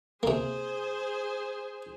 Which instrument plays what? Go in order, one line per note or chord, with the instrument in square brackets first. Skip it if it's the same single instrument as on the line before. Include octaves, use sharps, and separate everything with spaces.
[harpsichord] C3 A#3 [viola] G#4 C5